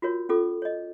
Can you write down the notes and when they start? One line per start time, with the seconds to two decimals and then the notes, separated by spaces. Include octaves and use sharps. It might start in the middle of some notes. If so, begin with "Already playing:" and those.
0.02 F4 F#4 A#4 C#5
0.29 C#4 F4 A4 D6
0.62 C#5 D#5